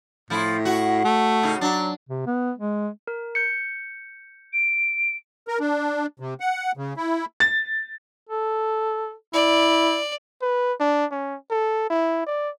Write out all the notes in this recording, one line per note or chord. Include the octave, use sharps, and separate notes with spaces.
A2 F3 E4
F#4
A3
A2 C#3 D#4
F#3 D4
C3
B3
G#3
A#4
G6 C#7
D7
A#4
D4
C3
F#5
C#3
E4
A6
A4
E4 D5
B4
D4
C#4
A4
E4
D5